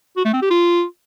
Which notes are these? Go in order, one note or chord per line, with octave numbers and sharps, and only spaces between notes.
F#4
A3
C4
G4
F4